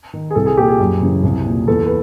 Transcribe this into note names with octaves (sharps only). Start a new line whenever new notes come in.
D#3
G#4
C2 A4
G#4
A#2 G4
G#4
F#2
C#3 E3
C2
A#2
E2 A4
B4